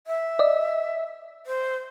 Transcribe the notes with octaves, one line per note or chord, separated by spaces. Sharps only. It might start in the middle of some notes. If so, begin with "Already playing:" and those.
E5
D5 D#5
C5